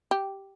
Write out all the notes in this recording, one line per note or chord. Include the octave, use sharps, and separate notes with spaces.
G4